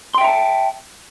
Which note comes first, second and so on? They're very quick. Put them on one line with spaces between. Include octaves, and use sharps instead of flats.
C6 G5 E5 A#5 A5